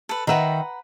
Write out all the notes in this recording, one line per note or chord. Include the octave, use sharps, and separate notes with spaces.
A4 B4
D#3 B4 E5 F#5 A#5